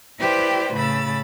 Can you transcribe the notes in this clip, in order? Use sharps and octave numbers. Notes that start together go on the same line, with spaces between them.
E4 G4 B4 C5 D5 G5
A2 C#3 B5 E6 A6